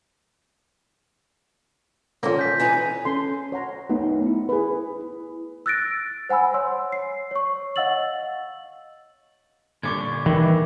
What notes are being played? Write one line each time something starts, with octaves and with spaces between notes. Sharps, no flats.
D3 F3 A#3 C#4 A#6
G6 B6
E3 B3 D#4 G#5
C#4 A4 C6
C#5 F#5 A#5
A3 B3 D#4
E4
G#4 B4
E6 F#6 A6 A#6 D7
C5 F#5 G#5 B5 E6
C#5 C6 E6
C7
C#5 C#6
D#5 F5 F#5 E6 A6 F#7
A#2 D3 G3 C#6 D6 G#6
D#3 E3